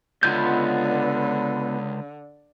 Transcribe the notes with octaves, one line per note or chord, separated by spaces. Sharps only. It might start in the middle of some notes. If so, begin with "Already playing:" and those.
C#2 D3 B3 F4 G6